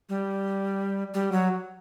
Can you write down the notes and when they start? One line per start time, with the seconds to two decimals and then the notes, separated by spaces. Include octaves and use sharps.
0.09 G3
1.14 G3
1.32 F#3